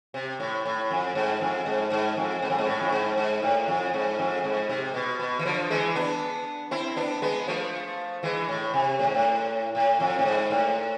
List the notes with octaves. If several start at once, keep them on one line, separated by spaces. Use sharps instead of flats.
C3
A2
A2
F2
G#2
F2
G#2
G#2
F2
G#2
F2
G#2
A2
F2
G#2
G#2
A2
F2
G#2
F2
G#2
C3
B2
B2
E3
D3 F3
E3 G#3
B3 D4
C4 E4
B3 D4
G#3 B3
F3 A3
E3 G#3
A2
C3
A2
G#2
A2
A2
F2
A2
G#2
A2